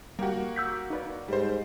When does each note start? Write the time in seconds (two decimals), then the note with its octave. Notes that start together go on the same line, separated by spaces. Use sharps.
0.19 G3 A#3 F#4 G4
0.56 E6 G6 B6
0.90 D#4 B4 D5
1.28 G#2 G3 C5